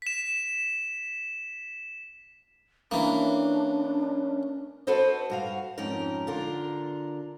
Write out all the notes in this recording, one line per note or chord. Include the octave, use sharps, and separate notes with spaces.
B6 E7
E3 A#3 C#4 D4
F#4 A4 B4 C5 D#5
G2 F#4 F5
F2 G#2 C#4 D#4 A#4
D3 F4 A#4